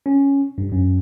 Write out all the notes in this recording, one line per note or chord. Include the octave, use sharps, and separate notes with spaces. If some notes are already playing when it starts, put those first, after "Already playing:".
C#4
G2
F#2